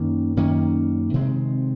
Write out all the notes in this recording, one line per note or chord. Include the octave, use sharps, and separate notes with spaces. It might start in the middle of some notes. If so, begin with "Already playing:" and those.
Already playing: F#2 D#3 A#3 C#4
F#2 D#3 A#3 C#4
C3 D#3 G#3 C4